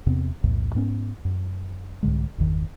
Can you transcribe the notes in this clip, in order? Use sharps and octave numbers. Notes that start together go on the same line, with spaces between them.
E2 C3 B3 C4
B1 E2 A2
G#2 B3 C#4
F#2
C2 G#2 D3 G#3
G1 E2 D#3